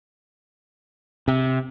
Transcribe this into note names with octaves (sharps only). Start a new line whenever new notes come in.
C3